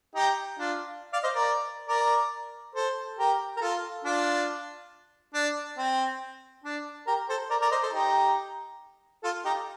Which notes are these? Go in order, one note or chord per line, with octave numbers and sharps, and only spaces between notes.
D#4 G4
D4 F4
D5 F5
C5 D#5
A#4 D5
A#4 D5
A4 C5
G4 A#4
A#4
F4 A4
D4 F4
D4
C4
D4
G4 A#4
A4 C5
A#4 D5
A#4 D5
C5 D#5
A4 C5
D#4 G4
F4 A4
D#4 G4